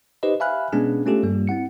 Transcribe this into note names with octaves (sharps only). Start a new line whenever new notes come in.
D#4 G4 B4 C5 D#5
E5 F5 G#5 B5 F6 F#6
B2 G#3 B3 C#4 D4 G#4
A3 C#4 F4 G4 A4
G2 G3 A#3
C4 E4 F#5 C#7